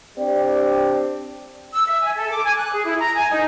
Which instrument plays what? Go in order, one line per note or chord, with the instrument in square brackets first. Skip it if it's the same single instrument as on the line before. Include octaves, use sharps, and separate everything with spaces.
[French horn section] C4 D4 G4 D5
[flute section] E6
E5
G#5
A4
D6
G#5
F#6
G#4
E4
A#5
G#5
D#4